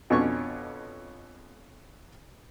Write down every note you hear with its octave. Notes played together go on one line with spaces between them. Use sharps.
F2 B2 C#4 D4 C#5 C#6